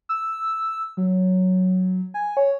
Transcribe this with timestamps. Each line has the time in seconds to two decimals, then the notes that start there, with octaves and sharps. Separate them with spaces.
0.09 E6
0.97 F#3
2.14 G#5
2.37 C#5